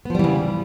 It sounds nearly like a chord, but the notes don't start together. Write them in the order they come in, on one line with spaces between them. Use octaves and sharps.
B3 F3 G3 E3 C#3